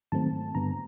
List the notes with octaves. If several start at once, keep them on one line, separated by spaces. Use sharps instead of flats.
G#2 D#3 F#3 A3 C4 A5
G2 D3 G3 B3 A#5